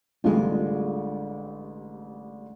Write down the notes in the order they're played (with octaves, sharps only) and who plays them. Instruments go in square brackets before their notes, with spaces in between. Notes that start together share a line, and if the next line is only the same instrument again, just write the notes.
[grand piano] A1 D3 G3 [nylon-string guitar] G#3 F4